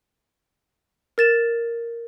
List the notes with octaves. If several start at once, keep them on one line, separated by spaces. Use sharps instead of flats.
A#4 A6 E7